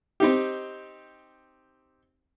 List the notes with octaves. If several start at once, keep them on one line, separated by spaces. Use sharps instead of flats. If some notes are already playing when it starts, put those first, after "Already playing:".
C4 D#4 G4